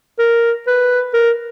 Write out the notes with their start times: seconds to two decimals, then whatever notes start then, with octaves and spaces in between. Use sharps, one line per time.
0.19 A#4
0.67 B4
1.14 A#4